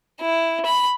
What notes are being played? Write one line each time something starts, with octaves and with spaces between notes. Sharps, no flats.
E4
B5